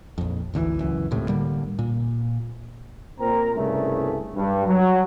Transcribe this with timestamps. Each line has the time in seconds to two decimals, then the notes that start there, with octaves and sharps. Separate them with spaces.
0.18 A#1 F2
0.54 G#1 D2 C#3 E3
0.80 C#2 F#2 E3
1.11 D#1 C#2 A2 C3
1.29 A2 D3 G3 A#3
1.79 A#2
3.20 A#2 C4 A#4 A#5
3.55 C2 G2 C#3 A3
4.36 G2
4.66 F#3